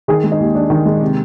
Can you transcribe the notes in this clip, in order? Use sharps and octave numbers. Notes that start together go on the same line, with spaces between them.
D#3 G#4
G#3
D#4
D#2
D#2 D4
D#3
G#3
C3